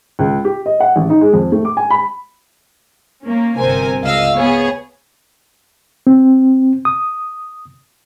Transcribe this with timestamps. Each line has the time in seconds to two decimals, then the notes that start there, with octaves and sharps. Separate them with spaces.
0.19 C#2
0.45 G4
0.66 D#5
0.80 F#5
0.96 A1
1.10 D#4
1.21 G#3
1.33 F2
1.52 A3
1.65 D6
1.77 G#5
1.90 B5
3.23 A#3 C#4
3.58 G1 C3 A#4 C5 G#5
4.03 C#2 D#5 F5 E6
4.35 B3 G#4 C#5
6.07 C4
6.85 D#6